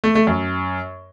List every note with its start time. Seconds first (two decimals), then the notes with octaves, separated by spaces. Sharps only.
0.04 A3
0.15 A3
0.27 F#2